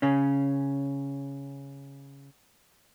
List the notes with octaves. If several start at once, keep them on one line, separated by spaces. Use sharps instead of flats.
C#3 C#4